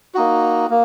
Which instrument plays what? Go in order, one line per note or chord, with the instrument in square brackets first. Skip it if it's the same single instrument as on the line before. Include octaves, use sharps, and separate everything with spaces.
[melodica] A#3 D#4 F#4
A#3